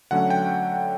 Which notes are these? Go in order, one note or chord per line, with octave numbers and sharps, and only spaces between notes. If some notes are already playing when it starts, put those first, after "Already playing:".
D3 F#3 A3 C#4 F#5
G5